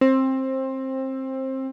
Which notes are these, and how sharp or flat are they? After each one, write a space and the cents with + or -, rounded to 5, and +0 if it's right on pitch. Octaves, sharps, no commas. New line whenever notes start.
C4 +20